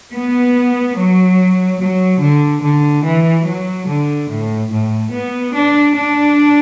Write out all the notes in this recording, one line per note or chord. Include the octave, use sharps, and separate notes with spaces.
B3
F#3
F#3
D3
D3
E3
F#3
D3
A2
A2
B3
D4
D4